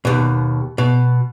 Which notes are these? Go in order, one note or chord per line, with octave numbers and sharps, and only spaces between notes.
D#2 B2
B2